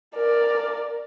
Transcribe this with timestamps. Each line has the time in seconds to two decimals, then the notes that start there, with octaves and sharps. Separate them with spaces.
0.15 A#4 D5